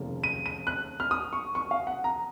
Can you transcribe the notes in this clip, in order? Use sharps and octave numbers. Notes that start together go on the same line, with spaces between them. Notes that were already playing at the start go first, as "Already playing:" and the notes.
Already playing: F1 D#2 C#3 F3 A#3
D#7
D#7
F#6
F6
D#6
C#6
C#6
F5
F#5
A#5